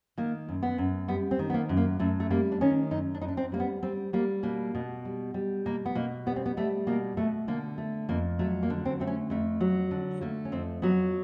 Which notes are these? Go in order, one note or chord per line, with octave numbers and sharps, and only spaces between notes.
D#3 A#3
F#2
B3
F#2
G3 B3
C4
D#3
B3
A#3
F#2
A#3
F#2 A3
A3
G3 A#3
D4
D#3 C#4
F#2 D#4
D4
F#2 D#4
D4
C4
G3 A#3
B3
G3 C4
G3 A#3
B2 A#3
B2
G3
G3
B2 A#3
B3
B2 A#3
G3 B3
C4
B3
G3 A3
B2 A#3
B2 A3
D3 A#3
A3
F2 A#3
F#3 A3
A#3
D3
C4
A3 C4
C#4
F2 A3
F#3
D3
A3 A#3
C#4
F2 C4
F#3 B3